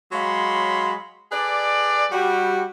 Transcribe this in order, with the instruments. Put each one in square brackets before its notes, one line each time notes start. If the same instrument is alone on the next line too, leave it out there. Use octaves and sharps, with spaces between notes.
[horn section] F#3 G#3 C#5 F5 B5 C6
G#4 A4 B4 D5
G3 F#4 G4